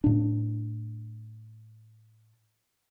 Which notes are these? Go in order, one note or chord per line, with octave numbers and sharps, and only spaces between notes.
A2 D4